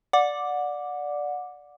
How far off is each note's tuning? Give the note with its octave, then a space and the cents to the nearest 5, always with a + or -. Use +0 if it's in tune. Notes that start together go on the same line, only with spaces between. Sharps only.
D5 +0 F#5 -25 D6 +0